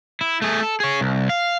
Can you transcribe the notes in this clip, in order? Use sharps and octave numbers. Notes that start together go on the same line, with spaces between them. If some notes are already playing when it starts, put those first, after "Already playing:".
E4
A3 G#4
A4
G#4 C#5
C2
F5